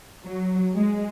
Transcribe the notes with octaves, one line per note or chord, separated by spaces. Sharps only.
F#3
G#3